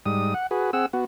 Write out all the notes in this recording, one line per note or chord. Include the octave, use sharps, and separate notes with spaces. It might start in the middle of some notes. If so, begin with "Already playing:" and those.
G#2 G3 D#6
F#5
F#4 G#4 B4
C4 G#4 F#5 E6
B3 F#4